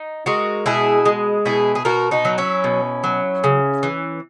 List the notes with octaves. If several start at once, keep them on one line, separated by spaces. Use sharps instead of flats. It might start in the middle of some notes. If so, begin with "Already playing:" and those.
Already playing: D#4
G#3 F#4 A#4
B2 E4 G#4
G#3
B2 E4 G#4
G#4
B2 F#4 A#4
D#4 F#4
F#3
C#4 E4
B2
F#3
C#3
E3